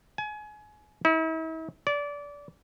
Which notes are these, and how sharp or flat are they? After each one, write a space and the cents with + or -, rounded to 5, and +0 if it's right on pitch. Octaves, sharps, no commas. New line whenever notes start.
G#5 +30
E4 -40
D5 -25